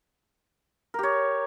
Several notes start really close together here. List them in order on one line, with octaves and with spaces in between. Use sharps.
A#4 G4 C#5